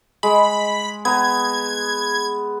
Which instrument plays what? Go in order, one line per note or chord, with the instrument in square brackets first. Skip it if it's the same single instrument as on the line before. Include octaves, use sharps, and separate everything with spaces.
[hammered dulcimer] G#3 [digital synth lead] B5
[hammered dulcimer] B3 A#5 [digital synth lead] G#6